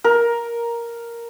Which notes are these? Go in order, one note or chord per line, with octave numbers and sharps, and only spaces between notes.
A#4